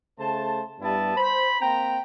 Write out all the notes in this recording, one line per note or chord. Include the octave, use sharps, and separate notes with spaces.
C#3 A3 C5 A5
G2 G3 B3 E4 A5
C5 B5
A#3 C4 G5 A#5